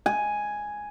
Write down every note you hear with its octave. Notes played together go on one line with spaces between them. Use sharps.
G#5